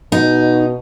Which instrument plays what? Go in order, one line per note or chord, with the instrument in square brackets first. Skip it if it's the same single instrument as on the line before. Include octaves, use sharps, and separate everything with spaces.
[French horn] B2 [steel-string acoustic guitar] D#4